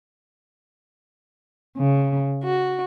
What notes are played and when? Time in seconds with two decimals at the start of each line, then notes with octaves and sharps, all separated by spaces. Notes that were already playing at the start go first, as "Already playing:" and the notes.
1.78 C#3
2.44 F#4